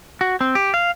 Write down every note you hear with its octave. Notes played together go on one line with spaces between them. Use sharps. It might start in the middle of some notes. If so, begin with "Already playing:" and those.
F#4
C4
G4
F5